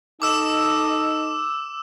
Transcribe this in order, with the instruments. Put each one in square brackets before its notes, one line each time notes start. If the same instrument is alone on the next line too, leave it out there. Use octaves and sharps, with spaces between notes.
[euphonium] D#4 [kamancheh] A4 D#5 [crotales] D6 E6 E7